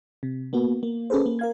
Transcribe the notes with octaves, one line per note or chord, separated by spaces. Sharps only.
C3
A#3 B3 F#4
A#3
C#4 G#4 A4 B4 C5
A#3
A#4 F5 G#6